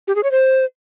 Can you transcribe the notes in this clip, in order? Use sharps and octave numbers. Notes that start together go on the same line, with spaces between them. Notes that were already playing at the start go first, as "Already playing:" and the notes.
G4
G#4
C#5
C5